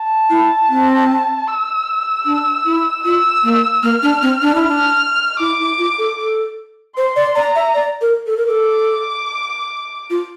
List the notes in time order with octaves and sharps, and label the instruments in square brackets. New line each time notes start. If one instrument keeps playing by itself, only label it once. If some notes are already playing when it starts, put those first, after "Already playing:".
Already playing: [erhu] A5
[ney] E4
C4
[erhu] E6
[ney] D4
E4
[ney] F4 [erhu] E6
[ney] A#3
[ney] A#3 [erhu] F6
[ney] D4
C4
D4
E4
[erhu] F6
[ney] D4
[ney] E4 [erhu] D6
[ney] E4
F4
A4
A4
[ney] C5 [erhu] C6
[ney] D5
[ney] D5 [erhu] A#5
[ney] E5
D5
A#4
A4
A#4
A4
[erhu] D6
[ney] F4